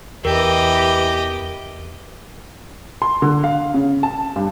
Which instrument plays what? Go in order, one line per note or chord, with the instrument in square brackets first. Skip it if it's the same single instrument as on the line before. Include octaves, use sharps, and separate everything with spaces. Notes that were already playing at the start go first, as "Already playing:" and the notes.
[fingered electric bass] E2 [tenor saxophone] E3 [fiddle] G4 D#5 [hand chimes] A#4
[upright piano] C6
D3
F5
C#3
A5
G2